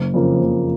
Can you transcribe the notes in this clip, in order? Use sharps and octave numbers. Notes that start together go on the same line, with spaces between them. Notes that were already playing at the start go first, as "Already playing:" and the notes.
Already playing: F#1
F2 C#3 F3 A#3
F#1